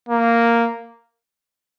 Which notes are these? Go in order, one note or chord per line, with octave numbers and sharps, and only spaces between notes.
A#3